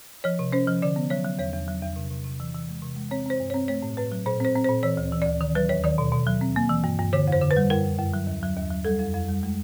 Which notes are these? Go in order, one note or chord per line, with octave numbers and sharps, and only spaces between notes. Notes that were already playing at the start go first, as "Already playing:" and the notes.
F3 C#5
C3
C#4 C5
F3
D3 D5
B3
F#3 C#5
F#3
E2 C#5
E2
F#3
E2
C3
C3
C3
E3
E3
G#3
C3
G#3
C4 C#5
C4 C5
G2
C#5
C4
A3 C#5
A2
A2 B4
F#3
A#2 C5
C4 C5
C4
C5
A#2
E3 C#5
D2
E3
D5
D2
D#3
F#3 B4
D#2 C#5
D#3 D5
B2
B2
F#3
C4
A#3
E3
G2
G2
D3 C#5
F2 C5
D3
B4
G3
F#2 A#4
F#2
F#2
F#3
D#2
F#3
D#2
F#3
G3 A4
F2
F2
G3
G#3